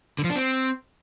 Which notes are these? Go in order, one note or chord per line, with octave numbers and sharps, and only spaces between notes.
D3
F3
D4
C4